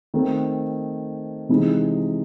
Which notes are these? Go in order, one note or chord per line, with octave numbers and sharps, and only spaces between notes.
D#3 A3 C4 D#4
C3 E3 G#3 D#4